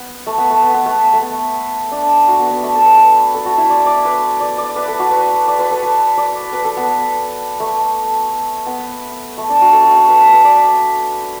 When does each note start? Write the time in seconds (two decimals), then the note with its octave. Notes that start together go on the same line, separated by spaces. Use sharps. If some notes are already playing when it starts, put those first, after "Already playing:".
Already playing: B3
0.26 A3
0.38 B3
0.50 A3
0.62 B3
0.74 B3
0.86 A3
1.13 A3
1.20 B3
1.92 D4
2.28 F#4
2.39 B3
2.51 B3
2.63 A3
2.75 A4
2.86 B4
2.98 B4
3.34 A4
3.46 F#4
3.57 E4
3.70 D5
3.86 D5
4.05 B4
4.40 D5
4.58 D5
4.76 B4
4.88 A4
4.99 F#4
5.11 B4
5.48 D5
5.59 B4
5.71 A4
5.83 B4
6.18 D5
6.53 B4
6.65 A4
6.77 B3
7.60 A3
8.67 B3
9.37 A3
9.50 D4
9.61 F#4
9.73 A4
9.85 F#4
9.97 A4
10.08 B4
10.20 B4
10.33 B4
10.44 D5